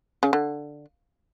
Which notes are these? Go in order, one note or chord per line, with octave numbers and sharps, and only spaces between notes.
C#3
D3